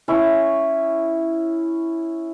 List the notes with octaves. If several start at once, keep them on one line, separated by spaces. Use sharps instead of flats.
C#4 E4 C#5